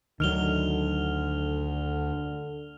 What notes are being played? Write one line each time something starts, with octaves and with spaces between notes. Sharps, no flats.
D2 D3 D#3 F#3 F6 F7 G7